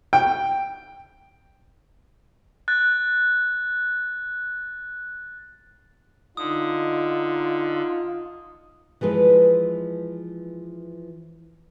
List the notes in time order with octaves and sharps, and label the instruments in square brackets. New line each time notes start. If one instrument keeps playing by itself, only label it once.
[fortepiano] G5
[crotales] F#6 A6
[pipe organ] D3 [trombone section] D#4 [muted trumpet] F4 [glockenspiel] D#6
[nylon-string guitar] E3 F3 G#3 B4